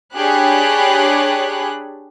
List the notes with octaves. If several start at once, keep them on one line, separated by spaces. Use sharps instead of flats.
D4 G4 G#4 C#5 B5 F#6